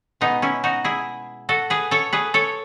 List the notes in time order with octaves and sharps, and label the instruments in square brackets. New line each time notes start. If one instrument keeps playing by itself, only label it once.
[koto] B2 G#3 B3 D#4
C#4 E4
D#4 F#4
E4 G#4
F#4 A4
G#4 B4
A4 C#5
G#4 B4
A4 C#5